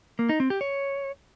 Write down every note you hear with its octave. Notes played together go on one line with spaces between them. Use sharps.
A#3
D#4
C4
G4
C#5